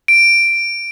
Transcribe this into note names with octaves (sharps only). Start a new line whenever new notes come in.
D7